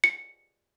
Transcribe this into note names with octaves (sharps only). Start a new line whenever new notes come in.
C#7